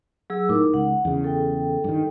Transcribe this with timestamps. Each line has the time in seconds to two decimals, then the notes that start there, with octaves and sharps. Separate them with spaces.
0.30 F#3 G#4 E6
0.49 A2 D#4 A#4 D6
0.74 C#2 F#5
1.05 E2 C#3
1.24 A4 G5
1.84 G2 D#3